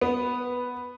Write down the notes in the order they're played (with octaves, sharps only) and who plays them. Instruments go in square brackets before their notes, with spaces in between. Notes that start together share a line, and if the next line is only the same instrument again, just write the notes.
[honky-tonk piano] B3